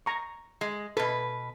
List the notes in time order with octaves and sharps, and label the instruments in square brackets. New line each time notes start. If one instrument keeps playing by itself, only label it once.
[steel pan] A#5 C#6
[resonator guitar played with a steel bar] G#3
[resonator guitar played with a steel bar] B2 B4 [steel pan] A4